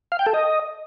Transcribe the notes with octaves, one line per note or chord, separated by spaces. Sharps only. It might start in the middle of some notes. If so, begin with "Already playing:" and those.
F5
G5
A4
D#5